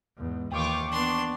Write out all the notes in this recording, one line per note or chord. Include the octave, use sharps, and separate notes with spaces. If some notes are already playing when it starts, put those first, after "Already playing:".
E2 G#2
D#2 E3 F4 G5 C#6 D6
B3 D4 C6